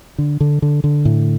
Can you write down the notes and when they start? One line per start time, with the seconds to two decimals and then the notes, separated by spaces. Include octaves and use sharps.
0.18 D3
0.40 D3
0.62 D3
0.84 D3
1.05 A2